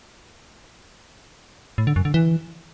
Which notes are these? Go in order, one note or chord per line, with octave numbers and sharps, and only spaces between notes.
A2
D3
F#2
D3
E3